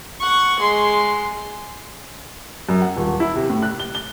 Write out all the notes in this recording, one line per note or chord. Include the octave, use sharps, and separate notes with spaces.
F#5 C#6
G#3 C6
F#2
F#5
D#1
E4
C3
A2
F#6
G7
G7